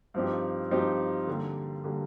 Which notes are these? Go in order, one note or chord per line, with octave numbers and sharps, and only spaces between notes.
G2 F3 C4 D#4 G4
G2 F3 C4 D#4 G4
D3 G3 A#3
D3 G3 A#3